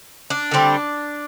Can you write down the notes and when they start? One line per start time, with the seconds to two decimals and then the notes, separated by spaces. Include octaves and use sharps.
0.30 D4
0.51 D3 G3 C4